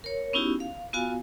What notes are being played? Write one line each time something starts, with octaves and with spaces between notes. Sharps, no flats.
A#4 C#5
B3 C#4 D#4 E4 F#4 G4
F5
B3 F4 F#4 F5 G#5